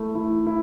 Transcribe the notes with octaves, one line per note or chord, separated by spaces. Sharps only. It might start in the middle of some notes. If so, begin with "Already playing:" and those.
Already playing: A3 E4
E4
E4